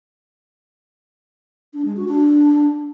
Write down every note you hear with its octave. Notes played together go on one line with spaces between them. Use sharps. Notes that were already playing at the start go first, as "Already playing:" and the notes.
D4
G#3
F#4
D4